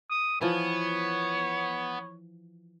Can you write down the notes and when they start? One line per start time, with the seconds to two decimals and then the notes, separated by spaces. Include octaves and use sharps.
0.10 D#6
0.41 E3 F3 B3 C#5